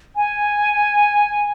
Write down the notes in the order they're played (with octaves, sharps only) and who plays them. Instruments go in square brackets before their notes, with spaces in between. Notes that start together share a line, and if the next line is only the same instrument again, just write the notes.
[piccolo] G#5